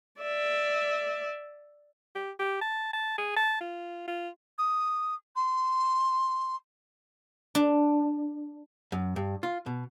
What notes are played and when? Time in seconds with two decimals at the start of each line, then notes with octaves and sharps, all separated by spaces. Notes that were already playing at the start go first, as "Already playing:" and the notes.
0.21 D5 E5
2.15 G4
2.39 G4
2.61 A5
2.93 A5
3.18 G#4
3.36 A5
3.60 F4
4.07 F4
4.58 D#6
5.35 C6
7.55 D4
8.92 F#2
9.16 G2
9.43 F4
9.66 B2